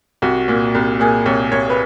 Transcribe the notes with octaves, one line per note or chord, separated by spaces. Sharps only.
C2 F#4
A#2
C2
A#2 G#4
C2 C#5
C2 C#5
B4